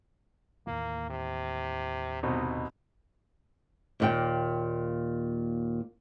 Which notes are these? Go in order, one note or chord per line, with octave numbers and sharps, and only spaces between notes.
D#2 A2 E3 A#3
C3
C2 B2 D#4
D#2 A#2 G5